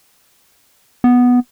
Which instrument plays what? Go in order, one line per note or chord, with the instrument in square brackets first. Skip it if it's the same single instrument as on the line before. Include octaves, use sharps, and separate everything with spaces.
[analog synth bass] B3